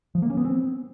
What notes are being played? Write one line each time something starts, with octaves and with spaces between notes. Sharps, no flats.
F3
A#3
C#4
B3
C4